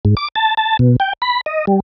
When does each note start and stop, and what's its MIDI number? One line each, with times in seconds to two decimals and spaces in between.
0.05 0.15 44
0.17 0.28 86
0.35 0.54 81
0.57 0.77 81
0.79 0.96 47
1.00 1.13 79
1.22 1.41 83
1.46 1.65 75
1.67 1.80 55